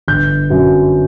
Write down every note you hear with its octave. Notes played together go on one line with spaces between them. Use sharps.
G1 G6
F#2 F#3